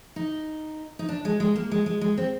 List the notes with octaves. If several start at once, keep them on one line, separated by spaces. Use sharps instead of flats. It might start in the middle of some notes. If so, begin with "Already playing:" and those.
D#4
D#4
D4
G#3
G#3
A#3
G#3
G#3
G#3
C4